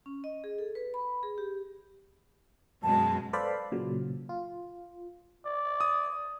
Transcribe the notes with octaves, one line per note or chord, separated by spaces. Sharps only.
C#4
D#5
G#4
A4
B4
B5
G#4
G4
F#2 B2 G#3 A5
A4 B4 C5 D5 F5 B5
A#2 C#3 F#3
F4
D5
D#6